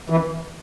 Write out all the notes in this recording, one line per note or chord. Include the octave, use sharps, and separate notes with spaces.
E3